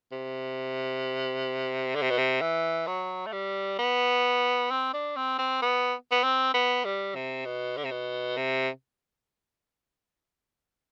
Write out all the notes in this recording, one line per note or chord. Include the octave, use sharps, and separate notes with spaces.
C3
D3
C3
B2
C3
E3
F#3
A3
G3
B3
C4
D4
C4
C4
B3
B3
C4
B3
G3
C3
B2
D3
C3
B2
C3